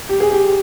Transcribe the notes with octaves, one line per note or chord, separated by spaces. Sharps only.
G4
G#4
G4